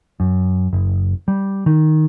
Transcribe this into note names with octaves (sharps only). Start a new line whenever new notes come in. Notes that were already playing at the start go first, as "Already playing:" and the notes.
F#2
F#1
G3
D#3